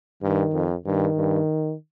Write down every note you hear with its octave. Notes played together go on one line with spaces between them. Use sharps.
G2 D#3
F2
G2 D#3
G2